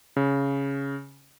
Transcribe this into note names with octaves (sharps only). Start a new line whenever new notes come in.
C#3